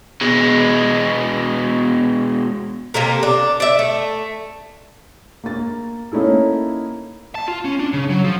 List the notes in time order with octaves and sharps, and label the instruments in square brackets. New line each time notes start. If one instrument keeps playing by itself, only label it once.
[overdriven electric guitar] B2 G#3
[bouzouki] C3 A#3 A4 A#4
D4
D5 E5
A3
[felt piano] A#3 A6
A#3 C#4 D#4 E4 A4
[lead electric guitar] A5
F4
C#4
D4
C#3
F#3
F3